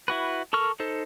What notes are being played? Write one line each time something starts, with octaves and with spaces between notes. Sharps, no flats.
E4 F#4 B4
A4 A#4 C#6 F6
D#4 A4 C5